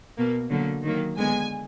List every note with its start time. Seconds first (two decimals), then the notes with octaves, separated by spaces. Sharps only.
0.17 B2 A#3
0.50 D3 F#3 A#3
0.84 D#3 F#3 A#3
1.17 D3 G#3 B3 G#5